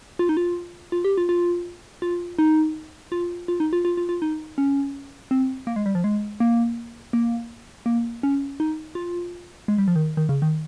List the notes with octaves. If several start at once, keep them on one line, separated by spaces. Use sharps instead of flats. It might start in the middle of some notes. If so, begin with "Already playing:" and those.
F4
D#4
F4
F4
G4
F4
F4
F4
D#4
F4
F4
D#4
F4
F4
F4
F4
D#4
C#4
C4
A#3
G#3
G3
F3
G#3
A#3
A#3
A#3
C#4
D#4
F4
G#3
G3
F3
D#3
D#3
C#3
D#3